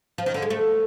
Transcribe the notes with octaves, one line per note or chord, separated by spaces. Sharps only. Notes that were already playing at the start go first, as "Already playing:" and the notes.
F3
D#3
D3
G#3
A3